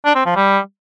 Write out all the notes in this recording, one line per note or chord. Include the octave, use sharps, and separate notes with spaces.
D4
C4
F3
G3